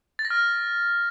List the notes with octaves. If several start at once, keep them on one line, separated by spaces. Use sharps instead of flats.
A6
A#6
F6